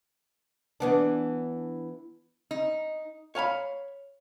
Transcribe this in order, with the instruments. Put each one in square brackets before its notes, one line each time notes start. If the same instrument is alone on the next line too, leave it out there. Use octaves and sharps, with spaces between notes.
[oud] E3 B3 D4
[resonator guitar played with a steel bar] D#4
[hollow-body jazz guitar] C#5 F5 A5 B5